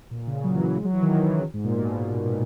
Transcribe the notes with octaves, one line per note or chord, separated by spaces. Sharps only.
A#2
C#3
F#3
E3
E3
G#3
F#3
E3
D#3
E3
F#3
C#3
G#2
A#2
B2